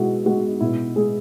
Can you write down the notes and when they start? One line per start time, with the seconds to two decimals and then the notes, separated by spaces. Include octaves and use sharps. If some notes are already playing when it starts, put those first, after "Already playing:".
Already playing: B2 G#3 E4 F#4
0.26 G#3 F#4
0.60 B2 E4
0.96 G#3 G#4